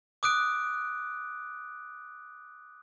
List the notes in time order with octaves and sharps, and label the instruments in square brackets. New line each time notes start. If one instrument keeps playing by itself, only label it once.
[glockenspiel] D6 D#6 F#6 D7